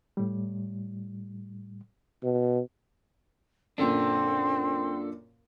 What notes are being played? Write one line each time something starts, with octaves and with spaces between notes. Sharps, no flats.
A2 G3
B2
F#2 A#2 C4 D4 A4